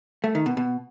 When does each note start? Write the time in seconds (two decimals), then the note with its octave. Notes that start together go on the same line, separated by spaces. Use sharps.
0.24 A3
0.35 D#3
0.46 B2
0.57 B2